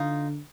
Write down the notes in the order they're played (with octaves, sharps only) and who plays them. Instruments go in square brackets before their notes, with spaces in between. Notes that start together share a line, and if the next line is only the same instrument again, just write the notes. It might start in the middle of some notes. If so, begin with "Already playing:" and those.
Already playing: [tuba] D3 [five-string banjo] D#4 F4